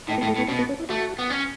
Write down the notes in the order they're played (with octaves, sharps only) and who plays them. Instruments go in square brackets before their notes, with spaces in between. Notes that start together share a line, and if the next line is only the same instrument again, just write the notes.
[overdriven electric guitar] A2 [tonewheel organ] D#4
[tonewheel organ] B3
[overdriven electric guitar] A2
[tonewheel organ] A3
[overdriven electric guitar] A2 [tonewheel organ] B3
[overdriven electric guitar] B2 [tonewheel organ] C#4
[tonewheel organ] B3
C#4
E4
[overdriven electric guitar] A3 [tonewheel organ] F#4
[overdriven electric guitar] B3
C#4